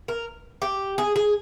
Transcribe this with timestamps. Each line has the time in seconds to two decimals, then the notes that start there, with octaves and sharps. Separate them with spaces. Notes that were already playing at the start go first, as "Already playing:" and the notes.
0.08 A#4
0.62 G4
0.98 G#4
1.16 G#4